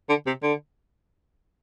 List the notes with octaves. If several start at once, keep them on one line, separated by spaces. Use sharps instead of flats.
D3
C3
D3